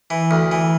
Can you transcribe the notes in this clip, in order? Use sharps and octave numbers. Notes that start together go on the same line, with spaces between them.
E3
D2
E3